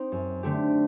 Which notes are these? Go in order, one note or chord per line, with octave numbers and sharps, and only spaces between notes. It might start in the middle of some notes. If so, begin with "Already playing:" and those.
Already playing: C4 D#4
F#2
D3 A3 C4 G4